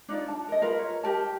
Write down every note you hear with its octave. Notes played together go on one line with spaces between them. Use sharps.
D4 D#4 F4 D5
A5
A#4 D#5
F4 A#4 B4
C#5
G4 A#4 A5